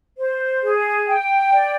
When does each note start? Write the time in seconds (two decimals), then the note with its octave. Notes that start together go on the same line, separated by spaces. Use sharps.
0.18 C5
0.62 G#4
1.08 G5
1.52 D5